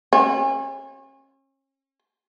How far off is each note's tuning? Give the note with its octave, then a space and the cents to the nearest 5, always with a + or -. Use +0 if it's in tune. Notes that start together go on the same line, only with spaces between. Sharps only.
C#4 -35